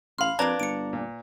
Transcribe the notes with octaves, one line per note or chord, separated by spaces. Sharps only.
A1 F5 B5 C6 F6
F2 A#3 D4 B4 A#5 G#6
G1 C#7 D7
A#2